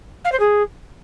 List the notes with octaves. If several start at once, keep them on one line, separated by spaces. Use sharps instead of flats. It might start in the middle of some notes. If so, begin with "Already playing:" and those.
F5
C5
G#4